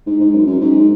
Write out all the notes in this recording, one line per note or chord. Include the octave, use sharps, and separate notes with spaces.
G#2
G#2
F#2
F#2
G#2